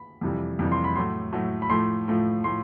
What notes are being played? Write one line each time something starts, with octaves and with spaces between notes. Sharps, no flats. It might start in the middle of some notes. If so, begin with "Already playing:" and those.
Already playing: B5
F2 C3 E3 G3
F2 C3 E3 G3
C6
B5
A2 F#3 A3 C6
A2 F#3 A3
B5
A2 F3 A3 C6
A2 F3 A3
A2 F3 C6